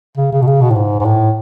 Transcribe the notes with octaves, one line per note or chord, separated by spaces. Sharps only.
C#3
C#3
B2
C#3
B2
A2
G#2
G#2
A2